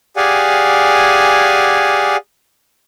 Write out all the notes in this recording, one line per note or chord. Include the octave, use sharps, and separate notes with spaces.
G4 G#4 D5 F5 F#5 G#5